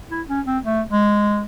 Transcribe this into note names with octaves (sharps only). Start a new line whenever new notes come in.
E4
C#4
C4
A3
G#3